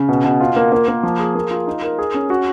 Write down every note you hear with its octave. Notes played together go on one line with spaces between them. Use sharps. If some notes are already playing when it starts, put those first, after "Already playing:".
Already playing: C#3
B2
B2
F4
A#3
A#3
A#3
F3
G#4
A#3
F4
D#4
A#4
G#4
C#4
F#4